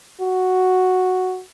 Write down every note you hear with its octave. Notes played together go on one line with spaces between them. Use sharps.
F#4